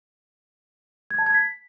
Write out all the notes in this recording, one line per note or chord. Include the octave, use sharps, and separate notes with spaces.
G#6
A5
G#6
B6